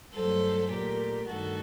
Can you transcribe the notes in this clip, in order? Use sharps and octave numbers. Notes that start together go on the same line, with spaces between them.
G2 F#3 A3 A4 C5
A#2 A3 G4 A#4
G2 D#3 A3 F#4 A4